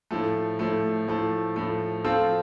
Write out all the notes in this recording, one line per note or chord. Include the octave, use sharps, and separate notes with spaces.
A2 F3 A3
A2 F3 A3
A2 F3 A3
A2 F3 A3
F3 C4 F4 A4 C5